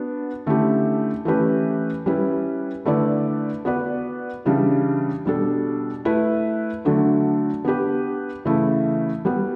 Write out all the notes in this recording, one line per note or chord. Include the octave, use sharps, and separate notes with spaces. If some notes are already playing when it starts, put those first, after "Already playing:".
Already playing: B3 D4 F#4
D3 A3 C#4 E4 G4
E3 A3 C#4 G4 B4
G3 C#4 E4 B4
D3 A3 E4 B4 D5
B3 F#4 B4 D5
C#3 E3 G3 D4
B2 G3 D4 A4
A3 E4 B4
D3 F#3 A3 D4 A4
B3 D4 G4 B4
C#3 E3 A3 E4
G3 B3 F#4 B4